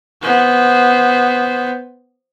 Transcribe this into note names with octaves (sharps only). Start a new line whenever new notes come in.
B3 C5